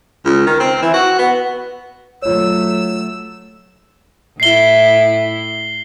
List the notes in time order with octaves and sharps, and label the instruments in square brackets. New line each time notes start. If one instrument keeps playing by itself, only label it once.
[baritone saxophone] C#2
D#3
C4
E3
F#4
B3
[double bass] F#3 A3 [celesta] F4 C#5 [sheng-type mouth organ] E6
[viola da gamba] A2 E4 [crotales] C7 G7